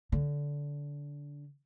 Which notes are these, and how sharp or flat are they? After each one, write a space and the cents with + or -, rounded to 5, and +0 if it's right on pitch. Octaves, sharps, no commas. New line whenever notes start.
D3 -20